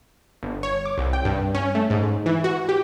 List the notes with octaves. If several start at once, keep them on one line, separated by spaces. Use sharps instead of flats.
G1
C#5
D6
C2
G5
G2
C#4
A3
G#2
E3
F#4
G4